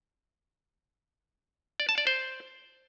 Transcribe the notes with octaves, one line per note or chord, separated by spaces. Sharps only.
D5
A5
D5
C5